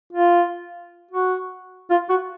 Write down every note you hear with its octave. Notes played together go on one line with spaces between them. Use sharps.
F4
F#4
F4
F#4